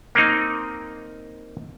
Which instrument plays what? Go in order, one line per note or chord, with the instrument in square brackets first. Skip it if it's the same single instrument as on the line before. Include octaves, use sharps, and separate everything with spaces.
[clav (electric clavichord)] A#3 C4 D#4